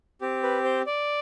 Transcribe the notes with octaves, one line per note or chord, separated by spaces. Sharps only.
C4 G4
B4
C5
D5